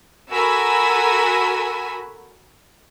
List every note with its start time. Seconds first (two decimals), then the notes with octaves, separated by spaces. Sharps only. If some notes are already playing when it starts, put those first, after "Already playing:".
0.31 F#4 A4 A#4 G#5 B5 E6